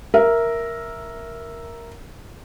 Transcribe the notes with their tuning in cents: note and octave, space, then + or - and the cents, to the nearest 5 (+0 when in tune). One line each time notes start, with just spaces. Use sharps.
A#4 +0 E5 +0